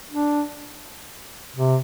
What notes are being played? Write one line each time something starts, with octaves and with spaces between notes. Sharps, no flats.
D4
C3